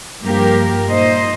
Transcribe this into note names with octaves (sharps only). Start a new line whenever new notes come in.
G2 F3 A#3 G4 A#4
A#2 A#3 D#4 C5 D#5